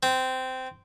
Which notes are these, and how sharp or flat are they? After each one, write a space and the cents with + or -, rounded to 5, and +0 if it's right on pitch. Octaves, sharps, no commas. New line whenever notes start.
C4 -15